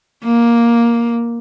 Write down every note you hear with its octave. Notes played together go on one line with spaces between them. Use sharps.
A#3